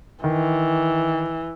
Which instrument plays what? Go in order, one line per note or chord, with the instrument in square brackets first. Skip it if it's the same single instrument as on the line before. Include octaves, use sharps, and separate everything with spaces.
[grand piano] D#3 [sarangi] E3